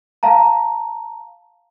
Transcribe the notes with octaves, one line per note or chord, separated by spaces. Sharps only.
F5 A5 A#5